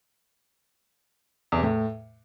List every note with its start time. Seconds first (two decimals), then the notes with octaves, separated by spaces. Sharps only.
1.52 E2
1.58 C3
1.63 A2